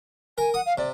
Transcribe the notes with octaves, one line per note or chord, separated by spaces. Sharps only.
A#4 G#5
F#5 D#6
F5
C3 D5